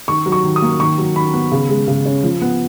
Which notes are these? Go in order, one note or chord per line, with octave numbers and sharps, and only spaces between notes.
D#3 C#6
F#3
C#6
D#3
D#6
A#3
D#3 C#6
F#3
D#3 B5
B3
C#3
G#3
C#3
C#4
F3
B3